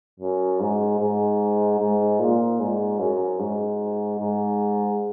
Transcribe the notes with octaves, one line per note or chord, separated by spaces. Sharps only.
F#2
G#2
G#2
G#2
A#2
G#2
F#2
G#2
G#2